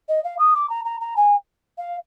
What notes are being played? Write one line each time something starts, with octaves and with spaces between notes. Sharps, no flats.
D#5
F5
D#6
D6
A#5
A#5
A#5
G#5
F5